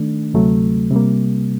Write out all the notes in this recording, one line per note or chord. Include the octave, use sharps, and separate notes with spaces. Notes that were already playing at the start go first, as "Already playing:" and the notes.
Already playing: D#3 A3 D4
D2 C3 F#3 A3
C3 G3 A#3